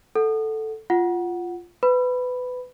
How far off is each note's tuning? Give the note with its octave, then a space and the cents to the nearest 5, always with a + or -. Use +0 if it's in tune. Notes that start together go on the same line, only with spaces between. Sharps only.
A4 +0 F#5 +0
F4 -5 F#5 +0
B4 +20 B5 +0